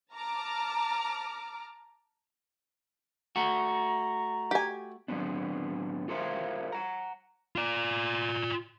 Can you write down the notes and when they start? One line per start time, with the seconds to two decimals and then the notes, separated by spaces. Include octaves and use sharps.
0.14 A5 A#5 D6 F6
3.36 A3 F#4 A#5
4.51 G4 G#5
5.08 A2 F#3 B3 C4 D4
6.08 F4 A4 A#4 C5 E5 F5
6.72 F#5 A#5
7.56 F4 D5